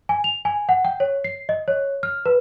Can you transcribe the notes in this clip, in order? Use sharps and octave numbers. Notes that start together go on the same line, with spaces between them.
G#5
F7
G#5
F#5
G5
C#5
C7
D#5
C#5
F6
B4